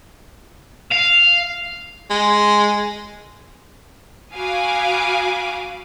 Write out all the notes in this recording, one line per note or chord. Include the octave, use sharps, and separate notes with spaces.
F5
G#3
F#4 F5 G#5 B5 D6 D#6